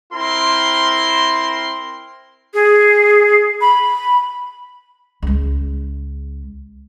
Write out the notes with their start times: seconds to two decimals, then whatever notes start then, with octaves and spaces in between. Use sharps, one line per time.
0.13 C4 E4 A#4 C6
2.54 G#4
3.61 B5
5.22 C#2 G#3